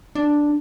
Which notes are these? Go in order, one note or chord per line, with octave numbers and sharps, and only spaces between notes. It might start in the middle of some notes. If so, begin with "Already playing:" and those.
D4